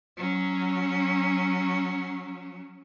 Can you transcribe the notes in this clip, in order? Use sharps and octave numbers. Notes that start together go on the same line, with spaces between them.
F#3 C#4